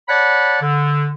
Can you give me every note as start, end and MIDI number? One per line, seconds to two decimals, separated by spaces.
0.08 0.58 73
0.08 0.58 74
0.08 0.58 78
0.08 0.58 81
0.08 0.58 83
0.62 1.11 50